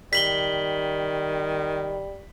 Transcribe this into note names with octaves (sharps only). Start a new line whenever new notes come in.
D#3 G3 B6 F#7 G7